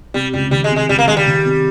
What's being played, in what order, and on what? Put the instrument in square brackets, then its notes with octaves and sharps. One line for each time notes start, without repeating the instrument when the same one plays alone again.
[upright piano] C3 [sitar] G3
[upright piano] C#2 [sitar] G3
[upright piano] D#3 [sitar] G3
[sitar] G#3
[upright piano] C3
[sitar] G#3
[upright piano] C#2 [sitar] G3
[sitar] A#3
[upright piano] D#3 [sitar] G#3
[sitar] G3
[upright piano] D#3
C3